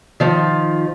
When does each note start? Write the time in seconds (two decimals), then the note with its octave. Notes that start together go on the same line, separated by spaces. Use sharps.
0.20 D#3 F3